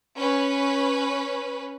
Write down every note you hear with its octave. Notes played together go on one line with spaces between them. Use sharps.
C#4 B4